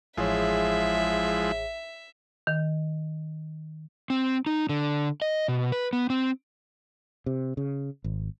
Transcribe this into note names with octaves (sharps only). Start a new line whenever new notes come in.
A1 F3 G#3 E4 G#4 C#5 E5
D#3
C4
D#4
D3
D#5
B2
B4
B3
C4
C3
C#3
G#1